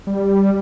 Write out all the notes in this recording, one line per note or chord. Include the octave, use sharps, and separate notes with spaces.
G3